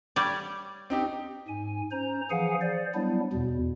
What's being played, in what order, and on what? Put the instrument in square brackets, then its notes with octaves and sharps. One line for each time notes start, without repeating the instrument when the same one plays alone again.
[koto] G3 C#5 D5
[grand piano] C4 D#4 G4
[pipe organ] G#2 G#5
C#4 C5 A#5
E3 F3 G#4 F5 F#5 G#5
C5 D5
F#3 G3 B3 D4 E4
E2 B2